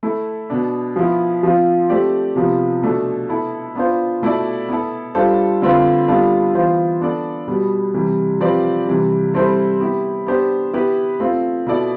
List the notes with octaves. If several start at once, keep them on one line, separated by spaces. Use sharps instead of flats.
A3 E4 A4
B2 B3 D4
F3 B3 E4
F3 C4 F4
A3 C4 G4 D5
C3 F3 B3
B2 A3 D4 A4
B3 E4 A4
B3 D4 F4 C5
B2 A3 E4 A4 D5
B3 E4 A4
G3 D4 F4 A4 C5
D3 A3 C4 F4 B4
G3 B3 D4 F4 A4
E3 B3 F4 C5
B3 D4 A4 D5
B2 G3 B3
C3 E3 G3
F3 C4 G4 B4 D5
C3 E3 G3
G3 C4 E4 A4 C5
B3 E4 G4
B3 D4 G4 C5
B3 E4 G4 B4
A3 C4 F4
B2 B3 E4 A4 D5